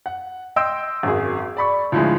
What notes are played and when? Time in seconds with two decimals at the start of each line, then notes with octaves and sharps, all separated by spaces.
0.06 F#5
0.56 D#5 G5 C6 E6 G6 D7
1.03 G#1 F#2 G#4
1.57 D5 B5 C#6
1.92 D2 A2 F3 G#3